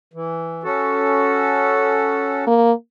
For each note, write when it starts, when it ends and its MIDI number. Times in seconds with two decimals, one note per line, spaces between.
0.14 0.63 52
0.64 2.45 61
0.64 2.45 66
0.64 2.45 69
2.47 2.72 58